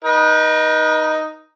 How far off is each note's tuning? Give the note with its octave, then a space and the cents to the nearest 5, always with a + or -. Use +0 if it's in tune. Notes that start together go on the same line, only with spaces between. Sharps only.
D#4 +0 B4 -40